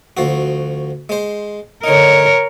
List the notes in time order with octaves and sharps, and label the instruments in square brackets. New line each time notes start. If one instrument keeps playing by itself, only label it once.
[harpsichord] D2 F3 F#4
G#3 C5
[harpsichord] D3 D#4 [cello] A#4 C#5